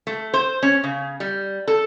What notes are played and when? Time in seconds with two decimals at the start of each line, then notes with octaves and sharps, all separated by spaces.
0.07 A3
0.34 C5
0.63 C#4
0.84 C#3
1.20 G3
1.67 A4